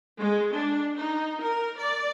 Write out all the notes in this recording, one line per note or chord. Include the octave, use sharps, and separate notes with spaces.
G#3
D4
D#4
A#4
D5